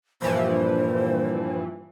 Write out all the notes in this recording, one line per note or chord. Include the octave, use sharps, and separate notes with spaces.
G2 A#2 E3 F3 C5